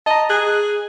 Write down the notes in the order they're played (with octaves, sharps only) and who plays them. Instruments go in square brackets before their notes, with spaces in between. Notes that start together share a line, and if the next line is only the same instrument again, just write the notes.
[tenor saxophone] D#5 [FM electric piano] A5 A#5
[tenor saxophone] G#4 [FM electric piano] F#6